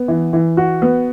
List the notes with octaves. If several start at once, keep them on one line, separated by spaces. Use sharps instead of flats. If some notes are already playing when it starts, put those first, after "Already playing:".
Already playing: B3
E3
E3
F#4
B3